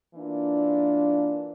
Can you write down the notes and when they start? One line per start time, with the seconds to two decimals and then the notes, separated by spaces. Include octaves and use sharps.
0.14 E3 A#3 D4 F4